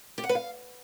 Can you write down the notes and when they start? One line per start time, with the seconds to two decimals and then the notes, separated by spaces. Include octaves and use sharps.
0.18 G4
0.24 F#5
0.29 B4
0.35 F5